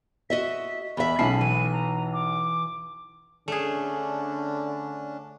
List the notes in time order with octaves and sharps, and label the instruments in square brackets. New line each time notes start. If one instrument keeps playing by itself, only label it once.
[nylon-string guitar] F#4 D#5 E5 [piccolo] B6
[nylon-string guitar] E2 E5 [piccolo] B5
[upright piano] B1 C7 [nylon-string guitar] C#4 A5 [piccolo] B5
[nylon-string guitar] E3 [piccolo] D#7
[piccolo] A#5
D6
[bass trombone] D3 [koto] A3 G#4 [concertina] C#4 D4